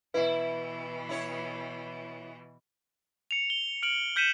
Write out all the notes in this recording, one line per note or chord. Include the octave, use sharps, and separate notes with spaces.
B2 E3 E4 B4 E5
E4 C#5
C#7 F7
G7
F6 D7 F#7
F6 G6 B6 C#7 D#7 E7